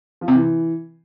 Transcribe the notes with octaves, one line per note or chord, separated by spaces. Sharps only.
F3
C3
E3